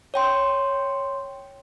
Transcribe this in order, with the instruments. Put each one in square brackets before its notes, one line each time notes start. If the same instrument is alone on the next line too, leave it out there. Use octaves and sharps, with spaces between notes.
[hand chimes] C#5 G5 C6